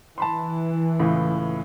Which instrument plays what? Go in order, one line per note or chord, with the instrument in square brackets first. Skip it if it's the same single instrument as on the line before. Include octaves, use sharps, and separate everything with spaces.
[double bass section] E3 [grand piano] A5 B5 C6
[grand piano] C#2 A2